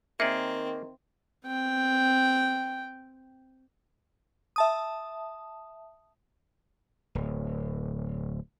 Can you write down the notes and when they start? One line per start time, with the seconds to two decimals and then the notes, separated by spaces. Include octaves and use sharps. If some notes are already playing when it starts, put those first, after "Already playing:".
0.20 D#3 A#3 C4 G#4 D5 E5
1.46 C4 G5
4.56 E5 A5 D#6
7.15 D1